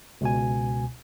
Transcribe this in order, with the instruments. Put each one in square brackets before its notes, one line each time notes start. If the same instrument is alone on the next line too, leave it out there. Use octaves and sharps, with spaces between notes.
[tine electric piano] C#2 B2 G#5